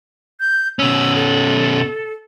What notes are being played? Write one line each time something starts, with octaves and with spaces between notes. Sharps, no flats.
G6
B2 C#4 E6
A4